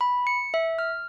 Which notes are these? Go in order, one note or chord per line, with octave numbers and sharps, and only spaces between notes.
B5
C#7
E5
F6